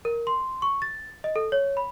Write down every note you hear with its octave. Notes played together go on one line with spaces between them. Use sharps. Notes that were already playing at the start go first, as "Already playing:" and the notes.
A#4
C6
C#6
A6
D#5
A4
C#5
B5